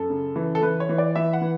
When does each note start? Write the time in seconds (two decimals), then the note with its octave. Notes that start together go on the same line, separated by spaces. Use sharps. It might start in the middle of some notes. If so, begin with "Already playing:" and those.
Already playing: F#2 A4
0.10 C#3
0.36 E3
0.55 A4
0.62 E3 B4
0.80 C#5
0.89 E3
0.98 D5
1.16 E3 E5
1.33 F#5
1.42 E3